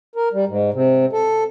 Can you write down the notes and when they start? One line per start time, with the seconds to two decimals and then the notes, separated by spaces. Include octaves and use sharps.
0.16 A#4
0.33 G3
0.47 G#2
0.74 C3
1.13 A4